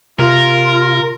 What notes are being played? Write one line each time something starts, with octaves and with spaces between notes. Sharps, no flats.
C3 F4 A#4